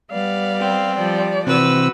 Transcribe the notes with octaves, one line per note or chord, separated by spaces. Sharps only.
G3 B3 D5 F5
C4
F3 G3 D5
C3 E3 C4 F#4 B4 E6